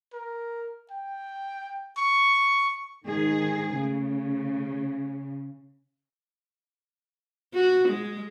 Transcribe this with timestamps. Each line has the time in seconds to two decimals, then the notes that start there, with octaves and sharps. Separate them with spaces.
0.13 A#4
0.91 G5
1.97 C#6
3.07 G#2 D#3 G#4
3.75 C#3 A3
7.54 F#4
7.88 G#3